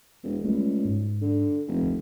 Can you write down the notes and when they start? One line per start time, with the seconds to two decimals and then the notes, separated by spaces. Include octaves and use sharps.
0.23 E1
0.44 C#2 G3 A3
0.85 G#2
1.21 D3
1.67 F1
1.82 D2